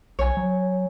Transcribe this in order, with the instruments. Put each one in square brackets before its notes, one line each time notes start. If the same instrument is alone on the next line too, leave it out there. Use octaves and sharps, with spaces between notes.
[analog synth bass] B1 [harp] C#5 G#5
[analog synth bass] F#3